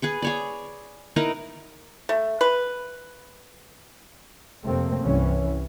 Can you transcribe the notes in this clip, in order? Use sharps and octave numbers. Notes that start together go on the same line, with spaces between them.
G#4 B4 C#6
G#4 C#5 D5
D#4 E4 A#4 B4
A3
B4
F1 C3 A3 A#3 C4
C2 G2 E3 C#4